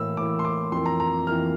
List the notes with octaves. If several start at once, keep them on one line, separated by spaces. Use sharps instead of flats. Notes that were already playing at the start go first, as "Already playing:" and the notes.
Already playing: A2 E3 A#3 E6
A2 E3 A#3 D6
C6
D6
F2 E3 A#3 C6
A#5
A#5
F2 E3 A#3 F6